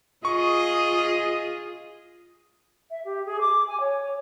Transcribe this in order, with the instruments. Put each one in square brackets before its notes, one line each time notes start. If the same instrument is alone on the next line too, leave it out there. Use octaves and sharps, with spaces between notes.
[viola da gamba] F4 G#4 [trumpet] D#5 [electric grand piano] C#6
[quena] E5
G4
G#4
D6
G#5
C#5